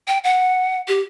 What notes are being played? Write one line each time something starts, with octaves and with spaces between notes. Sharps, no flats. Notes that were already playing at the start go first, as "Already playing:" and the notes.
G5
F#5
G4